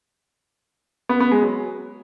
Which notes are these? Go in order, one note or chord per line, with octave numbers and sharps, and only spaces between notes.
B3
B3
G#3
F#3